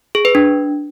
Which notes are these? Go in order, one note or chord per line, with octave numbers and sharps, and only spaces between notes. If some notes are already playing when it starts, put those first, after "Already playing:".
G#4
B4
D4